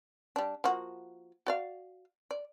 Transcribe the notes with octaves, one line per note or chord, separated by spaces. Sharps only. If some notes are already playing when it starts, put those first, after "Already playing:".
G3 D4
F3 A#3 F#4
F#4 D5 F5
D5